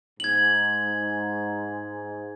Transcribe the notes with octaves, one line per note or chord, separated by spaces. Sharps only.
G#2 G#6 F#7